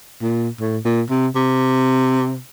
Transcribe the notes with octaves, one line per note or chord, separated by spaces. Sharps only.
A#2
A2
A#2
C3
C3